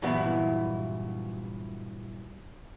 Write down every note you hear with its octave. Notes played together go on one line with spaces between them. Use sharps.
G2 A#2 E3 F#3 B3 E4